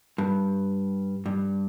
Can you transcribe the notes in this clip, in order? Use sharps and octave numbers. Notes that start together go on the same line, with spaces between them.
G2
G2